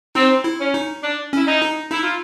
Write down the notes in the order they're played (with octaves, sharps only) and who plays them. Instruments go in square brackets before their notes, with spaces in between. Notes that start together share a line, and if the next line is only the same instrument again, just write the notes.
[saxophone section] C4 [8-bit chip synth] D#4
[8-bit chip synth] E4
[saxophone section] C#4
[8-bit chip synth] D#4
[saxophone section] D4
[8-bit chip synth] C#4 [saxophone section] E4
[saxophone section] D#4
[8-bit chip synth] D#4
[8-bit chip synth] D#4 [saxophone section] E4
[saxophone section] F4